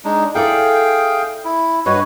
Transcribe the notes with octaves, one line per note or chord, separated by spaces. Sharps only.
G#3 D4 D#4
E4 G#4 A4 D5 F5 G5
E4
G2 F#4 B4 C#5 D#5